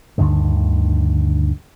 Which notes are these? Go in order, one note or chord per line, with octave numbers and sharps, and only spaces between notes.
D2 G2 D3 D#3